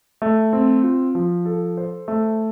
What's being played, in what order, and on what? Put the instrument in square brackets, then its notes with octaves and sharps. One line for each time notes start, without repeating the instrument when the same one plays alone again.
[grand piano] A3
C4
F4
F3
A4
C5
A3